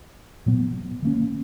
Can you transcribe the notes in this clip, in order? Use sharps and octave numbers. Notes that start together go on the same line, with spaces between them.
A#2 F#3 B3
D#3 A#3 C#4